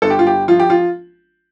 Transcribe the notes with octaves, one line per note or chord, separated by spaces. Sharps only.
G1 A4
G4
F4
G1 G4
F3 F4
G4
F4